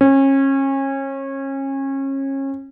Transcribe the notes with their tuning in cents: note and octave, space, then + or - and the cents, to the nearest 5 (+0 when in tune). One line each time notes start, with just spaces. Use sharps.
C#4 -30